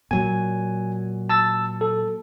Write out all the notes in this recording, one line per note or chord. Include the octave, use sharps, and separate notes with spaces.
A#2 F#3 G#5
A5 E6 A6
A4